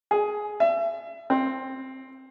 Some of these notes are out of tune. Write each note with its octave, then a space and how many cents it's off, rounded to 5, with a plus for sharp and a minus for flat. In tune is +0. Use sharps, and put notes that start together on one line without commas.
G#4 +10
E5 +35
C4 +10